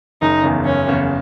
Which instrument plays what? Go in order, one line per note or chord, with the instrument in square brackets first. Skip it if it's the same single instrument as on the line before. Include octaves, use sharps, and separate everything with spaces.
[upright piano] F#1 [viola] D#4
[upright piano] E2 C#3
[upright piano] F#1 [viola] C#4
[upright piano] E2 C#3